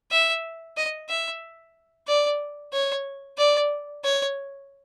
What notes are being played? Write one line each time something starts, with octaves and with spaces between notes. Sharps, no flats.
E5
D#5
E5
D5
C#5
D5
C#5